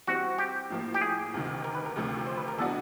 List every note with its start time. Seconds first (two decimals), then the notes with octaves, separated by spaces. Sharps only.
0.07 E3 G3 C4 F#4
0.38 G4
0.70 A2 F3 A#3
0.94 G4
1.01 G#4
1.34 D2 C3 D#3
1.64 A#4
1.75 B4
1.86 A#4
1.96 D2 C3 F3 A3
2.27 C5
2.37 B4
2.48 A#4
2.58 E3 G#3 B3 D4 F#4 A4